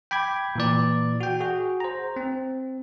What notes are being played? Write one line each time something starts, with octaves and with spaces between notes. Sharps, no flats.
G5 B5 D6 G#6
A#2 E3 D5
F#4 G5
F#4 G#4
C5 A#5
C4